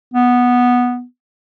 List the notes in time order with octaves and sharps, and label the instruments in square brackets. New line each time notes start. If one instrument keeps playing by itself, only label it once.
[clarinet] B3